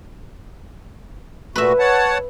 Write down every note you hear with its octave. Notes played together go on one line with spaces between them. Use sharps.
A#2 A3 F#4 B4 E5
C#5 F#5 A5